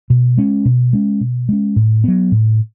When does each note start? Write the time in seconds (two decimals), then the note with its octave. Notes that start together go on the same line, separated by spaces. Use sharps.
0.10 B2
0.37 G#3 C#4
0.65 B2
0.93 G#3 C#4
1.21 B2
1.49 G#3 C#4
1.76 A2
2.04 F#3 B3
2.32 A2